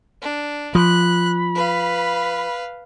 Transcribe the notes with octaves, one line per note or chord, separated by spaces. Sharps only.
D4
F3 B5 F#6
B4 F5